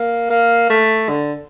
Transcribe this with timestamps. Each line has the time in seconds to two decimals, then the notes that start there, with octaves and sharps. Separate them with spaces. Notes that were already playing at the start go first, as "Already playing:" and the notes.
Already playing: A#3
0.30 A#3
0.70 A3
1.09 D3